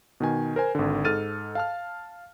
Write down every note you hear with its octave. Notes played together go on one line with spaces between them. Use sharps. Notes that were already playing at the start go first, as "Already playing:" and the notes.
B2 D#3 G#5
A#4 C5 G#5
G#1 D3
G#2 A4 F6 A6 D#7
F5 A5 F6